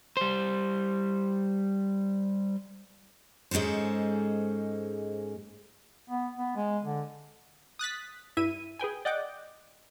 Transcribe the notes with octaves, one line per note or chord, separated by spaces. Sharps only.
G3 C5
G#2 G#3 C#4 A4 C5
B3
B3
G#3
D3
D#6 F#6 A6 B6
G2 E4 E5 D#7
G#4 B4 G5 G#5
D5 D#5 F#5 G5 D6